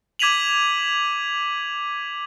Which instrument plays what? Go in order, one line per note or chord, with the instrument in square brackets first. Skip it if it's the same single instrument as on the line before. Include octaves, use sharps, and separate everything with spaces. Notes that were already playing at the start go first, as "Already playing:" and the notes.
[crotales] D6 G#6 B6 D#7 F7 F#7